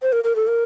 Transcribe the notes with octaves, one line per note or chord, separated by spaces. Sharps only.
C5
A#4
A#4
A4
A#4